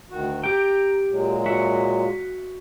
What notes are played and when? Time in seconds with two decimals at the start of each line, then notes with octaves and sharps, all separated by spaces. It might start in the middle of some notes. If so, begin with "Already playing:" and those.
0.11 D2 D#3 F#4
0.44 G4 G5 A#5
1.09 A#2 F#3 G#3
1.46 F#4 E5